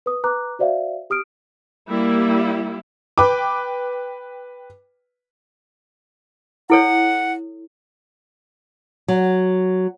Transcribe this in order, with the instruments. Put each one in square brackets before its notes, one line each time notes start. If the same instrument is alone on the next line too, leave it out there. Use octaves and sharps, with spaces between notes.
[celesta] B4 D#6
B4 A#5 D6 F#6
F#4 C5 D5 E5 F5
G4 D#6 F6 D7
[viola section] G3 A#3 E4
[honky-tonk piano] B4 G5 D6
[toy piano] E4 A4 C#5 [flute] F#5
[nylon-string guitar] F#3